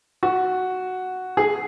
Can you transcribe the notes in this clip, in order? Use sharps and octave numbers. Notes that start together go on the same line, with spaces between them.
F#4
G#4